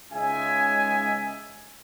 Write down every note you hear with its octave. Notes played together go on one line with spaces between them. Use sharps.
C#2 C#3 G#3 D#4 E5 G#5